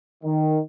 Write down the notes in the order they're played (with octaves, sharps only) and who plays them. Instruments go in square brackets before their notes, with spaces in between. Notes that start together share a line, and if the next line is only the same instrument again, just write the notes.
[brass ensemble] D#3